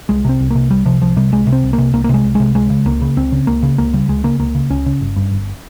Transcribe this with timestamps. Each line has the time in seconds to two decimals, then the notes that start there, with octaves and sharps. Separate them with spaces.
0.09 C2 G#3
0.25 C3 C4
0.40 C2
0.50 C3 A#3
0.71 C2 G3
0.85 C3 F3
1.01 C2 F3
1.16 C3 G3
1.32 C2 G#3
1.47 C3
1.52 C4
1.63 C2
1.73 A#3
1.78 C3
1.93 C2 A#3
2.04 A#3
2.09 C3 G#3
2.24 C2
2.35 C3 G#3
2.55 C#2 G#3
2.70 C#3
2.85 C#2 A#3
3.02 C#3
3.17 C#2 C4
3.32 C#3
3.47 C#2 A#3
3.63 C#3
3.78 C#2 A#3
3.93 C#3 G3
4.08 C#2 G#3
4.24 C#3 A#3
4.39 C#2 A#3
4.55 C#3
4.70 C#2 C#4
4.86 C#3
5.01 G1
5.16 G2
5.32 G1